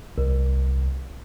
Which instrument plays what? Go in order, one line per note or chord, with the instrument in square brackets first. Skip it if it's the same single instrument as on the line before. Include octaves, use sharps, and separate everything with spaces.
[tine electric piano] C2